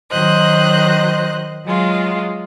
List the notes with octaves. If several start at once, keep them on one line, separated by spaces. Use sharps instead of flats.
D#3 F#3 C5 D#5 F#6
F#3 G#3 F4